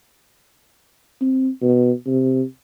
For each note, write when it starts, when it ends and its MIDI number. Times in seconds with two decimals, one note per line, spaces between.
1.21 1.49 60
1.62 1.91 47
2.06 2.42 48